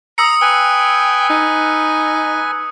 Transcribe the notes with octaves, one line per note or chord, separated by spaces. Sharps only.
A#5 D#6 E6 C#7
B4 G5 G#5
D#4